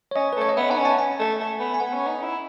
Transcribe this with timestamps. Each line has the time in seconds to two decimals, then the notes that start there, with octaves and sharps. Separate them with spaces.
0.11 C#5
0.16 C#4 D#5
0.33 B4
0.37 A3 C#5
0.49 D#5
0.57 B3 E5
0.71 D#4 F#5
0.78 C#4
0.85 A5
0.99 G#5
1.20 A3
1.40 A3
1.60 B3
1.74 G#5
1.80 B3 F#5
1.93 C#4
2.07 D#4
2.22 E4